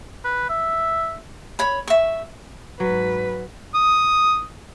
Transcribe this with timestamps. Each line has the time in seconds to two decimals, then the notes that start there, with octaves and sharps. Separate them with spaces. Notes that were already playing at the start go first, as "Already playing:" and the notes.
0.25 B4
0.49 E5
1.59 C#5 B5
1.88 E5 C#6
2.80 G#2 F#3 B4
3.75 D#6